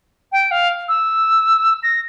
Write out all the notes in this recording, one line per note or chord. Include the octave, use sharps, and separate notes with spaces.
G5
F5
E6
A#6